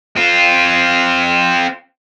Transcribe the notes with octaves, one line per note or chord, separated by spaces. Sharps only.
C4 F4